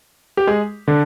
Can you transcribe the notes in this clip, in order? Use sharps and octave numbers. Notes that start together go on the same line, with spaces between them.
G4
G#3 G#4
D3 D4